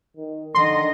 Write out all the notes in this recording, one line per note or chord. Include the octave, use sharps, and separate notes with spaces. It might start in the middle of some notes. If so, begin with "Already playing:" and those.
D#3
D3 D#3 D#5 C6